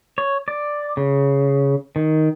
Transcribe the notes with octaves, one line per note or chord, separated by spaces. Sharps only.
C#5
D5
C#3
D#3